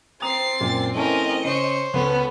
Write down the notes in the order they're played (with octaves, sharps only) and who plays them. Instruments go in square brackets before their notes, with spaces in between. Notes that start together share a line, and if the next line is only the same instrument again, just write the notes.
[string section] C4 [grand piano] A#5 D#6 F7 [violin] A6 C7
[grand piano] F#2 A#2
[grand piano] E3 A3 G#5 [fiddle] C#4 A#4 [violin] D#5
[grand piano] C#3 [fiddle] C5 C#5 [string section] C#7
[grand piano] C#2 [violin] B3 [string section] C#4 A4 B4